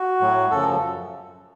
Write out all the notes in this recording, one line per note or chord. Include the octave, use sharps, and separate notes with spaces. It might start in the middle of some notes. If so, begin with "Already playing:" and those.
Already playing: F#4
A2 F#3
F#2 C#3 F3 A4